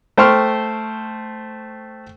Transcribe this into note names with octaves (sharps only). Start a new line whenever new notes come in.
A3 C5 G5 C6 C#6 F6